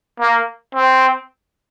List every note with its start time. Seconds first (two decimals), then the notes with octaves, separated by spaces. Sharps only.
0.20 A#3
0.75 C4